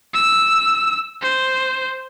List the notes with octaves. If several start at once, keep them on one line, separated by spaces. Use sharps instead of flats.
E6
C5